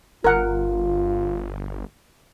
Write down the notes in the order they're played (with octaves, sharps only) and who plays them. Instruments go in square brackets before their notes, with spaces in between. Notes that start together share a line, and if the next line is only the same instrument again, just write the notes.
[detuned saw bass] G1 [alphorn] F4 [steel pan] A#4 F#5